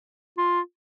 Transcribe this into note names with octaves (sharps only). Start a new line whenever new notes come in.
F4